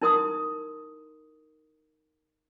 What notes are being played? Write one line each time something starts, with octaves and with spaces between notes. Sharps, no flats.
D#4 E4 A#4 C6 D#6